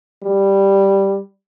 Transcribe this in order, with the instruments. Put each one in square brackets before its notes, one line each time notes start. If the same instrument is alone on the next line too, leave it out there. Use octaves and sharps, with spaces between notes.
[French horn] G3